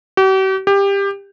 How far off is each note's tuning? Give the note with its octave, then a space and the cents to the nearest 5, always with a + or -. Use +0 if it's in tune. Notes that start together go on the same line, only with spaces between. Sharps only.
G4 -45
G4 +20